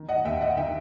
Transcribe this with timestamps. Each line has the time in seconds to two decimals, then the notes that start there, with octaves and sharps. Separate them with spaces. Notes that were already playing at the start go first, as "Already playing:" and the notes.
Already playing: D#3
0.09 D#5 F#5
0.25 D#2 E5 G5
0.41 D#5 F#5
0.57 D#3 E5 G5